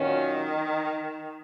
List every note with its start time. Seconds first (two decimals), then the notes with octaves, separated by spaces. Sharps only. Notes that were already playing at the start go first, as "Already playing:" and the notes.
Already playing: A#2 D#3 F#3 C#4